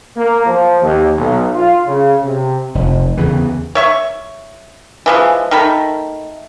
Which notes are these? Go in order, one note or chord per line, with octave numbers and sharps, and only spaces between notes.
A#3
F3
D#2
B1
F4
C#3
C3
F1
E2 C#3 E3
C#5 E5 C#6
E3 F3 G#3
D#3 A3 B5